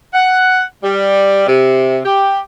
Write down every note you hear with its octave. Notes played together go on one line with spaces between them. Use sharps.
F#5
G3
C3
G4